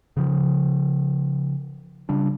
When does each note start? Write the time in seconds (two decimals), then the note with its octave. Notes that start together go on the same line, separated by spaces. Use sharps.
0.17 C#3 F3
2.09 C#3 G3 D4